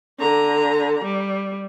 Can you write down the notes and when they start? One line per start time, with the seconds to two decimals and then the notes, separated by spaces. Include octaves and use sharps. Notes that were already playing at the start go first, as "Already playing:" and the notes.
0.19 D3 A#5
1.04 G3